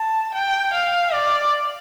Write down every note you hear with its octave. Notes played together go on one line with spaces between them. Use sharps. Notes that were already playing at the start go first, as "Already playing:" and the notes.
Already playing: A5
G5
F5
D5